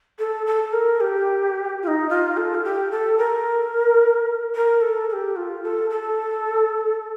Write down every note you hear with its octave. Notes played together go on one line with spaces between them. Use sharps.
A4
A4
A#4
G4
F4
D#4
F4
A4
F4
G4
A4
A#4
A#4
A4
A4
G4
F4
A4
A4